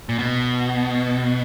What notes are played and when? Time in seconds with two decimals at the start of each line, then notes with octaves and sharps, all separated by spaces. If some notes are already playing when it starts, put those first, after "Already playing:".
0.09 A#2
0.19 B2